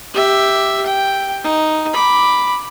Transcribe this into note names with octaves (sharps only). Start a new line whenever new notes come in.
G4 E5
G5
D#4
B5 D6